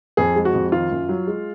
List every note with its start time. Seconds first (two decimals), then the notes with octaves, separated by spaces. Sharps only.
0.17 F2 G#4
0.36 G#3
0.45 F#4
0.54 F2
0.72 D#3 F4
0.92 F#2
1.09 F#3
1.27 G#3